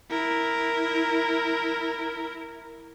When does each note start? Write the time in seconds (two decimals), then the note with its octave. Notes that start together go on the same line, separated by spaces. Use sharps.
0.11 E4 A#4